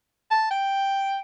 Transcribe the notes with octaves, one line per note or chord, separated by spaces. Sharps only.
A5
G5